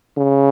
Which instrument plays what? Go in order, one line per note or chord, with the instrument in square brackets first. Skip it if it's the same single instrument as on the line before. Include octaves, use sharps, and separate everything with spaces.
[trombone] C#3